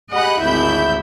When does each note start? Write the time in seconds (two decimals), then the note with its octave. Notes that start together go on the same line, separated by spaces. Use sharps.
0.11 G4 G#4 D#5 F#5 B5 F#6
0.41 G#1 D2 E4 E5 B5 G6